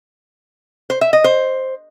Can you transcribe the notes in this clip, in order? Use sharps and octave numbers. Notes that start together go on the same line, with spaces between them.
C5
E5
D#5
C5